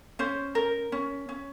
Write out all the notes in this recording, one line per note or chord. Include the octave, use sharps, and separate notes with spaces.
C#4 C5
A#4
C#4
C#4